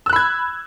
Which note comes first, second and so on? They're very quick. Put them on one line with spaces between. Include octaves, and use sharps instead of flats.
E6 F#6 B5 G#6